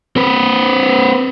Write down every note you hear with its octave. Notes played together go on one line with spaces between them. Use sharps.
C4 B4